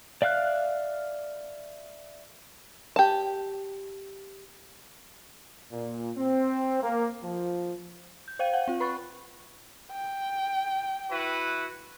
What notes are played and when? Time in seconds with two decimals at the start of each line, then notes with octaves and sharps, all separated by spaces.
0.22 D5 E5 F5 F6 F#6
2.96 G4 A5
5.72 A#2
6.17 C4
6.81 A#3
7.22 F3
8.28 G6
8.39 C5 F5 G5 D#7
8.53 F5 F#5
8.68 C4 F4
8.80 B4 B5 C#6 F#6 A6
9.92 G5
11.11 E4 F#4 B4